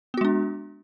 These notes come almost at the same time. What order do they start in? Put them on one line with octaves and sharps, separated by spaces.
B3 F#4 G#3 D4